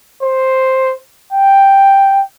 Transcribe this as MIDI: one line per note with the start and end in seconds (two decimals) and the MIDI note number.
0.23 0.94 72
1.32 2.23 79